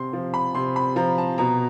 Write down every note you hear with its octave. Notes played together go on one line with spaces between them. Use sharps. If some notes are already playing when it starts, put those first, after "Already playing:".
Already playing: C3 C6
F3
B5
C3 C6
B5
F3 A#5
A5
B2 A#5